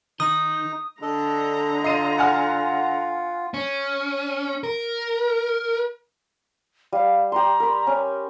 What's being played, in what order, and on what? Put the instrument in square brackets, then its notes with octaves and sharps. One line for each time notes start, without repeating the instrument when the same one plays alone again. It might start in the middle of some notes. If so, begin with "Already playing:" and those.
[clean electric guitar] D#3 [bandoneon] D#4 [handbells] D#6
[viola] D3 A#5 [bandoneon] D4 A4 D#5
[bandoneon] F4 [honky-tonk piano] D#5 C7 D#7
[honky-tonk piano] F#5 G#5 F6
[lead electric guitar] C#4
A#4
[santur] G3 [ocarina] F5
[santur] G4 C6 [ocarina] A#5
[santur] A#4 B5
C#4